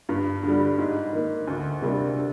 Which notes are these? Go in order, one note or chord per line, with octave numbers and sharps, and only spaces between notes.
G2
D3 G3
G#2
D#3 A#3
D2
C3 G3 A#3 D4
D3